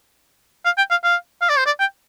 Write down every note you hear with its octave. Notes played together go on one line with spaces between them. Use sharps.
F5
G5
F5
F5
F5
D5
C5
D5
G5